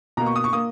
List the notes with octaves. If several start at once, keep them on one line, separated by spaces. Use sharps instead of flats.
B2 A#3 A#5
C#6
D#6
C#6
A#3 D#6